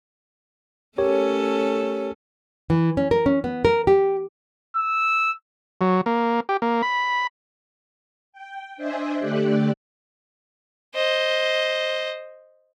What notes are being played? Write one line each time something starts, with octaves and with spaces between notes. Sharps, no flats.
A3 C#4 G4 A4 A#4 C#5
E3
C#4
A#4
C#4
B3
A#4
G4
E6
F#3
A#3
G4
A#3
B5
G5
D4 C5 D#5 E5 G#5
D3 A3 G4 D5 F#6
C5 D#5